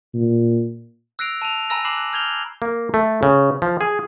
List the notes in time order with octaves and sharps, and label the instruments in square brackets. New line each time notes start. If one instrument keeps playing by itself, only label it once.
[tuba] A#2
[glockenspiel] E6 F#6 A#6 C7 D7 F7
A5 D#7 F7
G#5 A#5 B5 E6 A#6
B5 D6 F#6 C7 E7 F#7
F#6
F6 G6 G#6 F7 G7
[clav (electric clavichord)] A#3
A3
C#3
F3
G#4